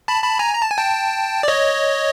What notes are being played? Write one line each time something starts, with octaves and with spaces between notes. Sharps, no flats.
A5 B5
A5 B5
G#5 A#5
A#5
A5
G#5
G5 A5
D5
C#5 D#5